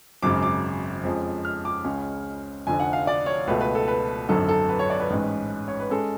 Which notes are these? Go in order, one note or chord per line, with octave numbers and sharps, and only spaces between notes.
G#1 F#2 C#3 G#3 D6
D6
F2 F3 G#3 C#4
F6
D6
C#2 C#3 G#3 C#4
F1 F2 D3 G#5
F#5
F5
D5
C#5
C#2 B2 A3 B4
B4
A4
B4
G#1 F#2 D3 F#3 A4
A4
B4
C#5
D5
B4
A1 G#2 G#3 C#4
C#5
B4
G#3 C#4 A4